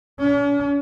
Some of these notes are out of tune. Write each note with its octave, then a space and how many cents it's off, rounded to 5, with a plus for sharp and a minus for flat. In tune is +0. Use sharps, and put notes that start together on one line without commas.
C#4 +45